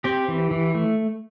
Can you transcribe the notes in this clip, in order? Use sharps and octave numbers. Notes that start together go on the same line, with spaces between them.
C4 G4
E3
E3
A3